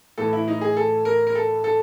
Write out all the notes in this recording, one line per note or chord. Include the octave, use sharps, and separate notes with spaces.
A2 E3 A4
E4
D#4
G#4
A4
A#4
A#4
A4
A4